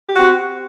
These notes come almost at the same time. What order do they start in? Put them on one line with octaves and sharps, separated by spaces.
G4 F#4 C4